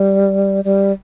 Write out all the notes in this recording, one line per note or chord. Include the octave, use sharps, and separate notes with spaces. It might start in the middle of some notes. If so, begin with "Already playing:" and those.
Already playing: G3
G3